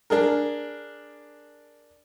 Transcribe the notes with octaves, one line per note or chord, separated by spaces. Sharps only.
D4 G#4 A#4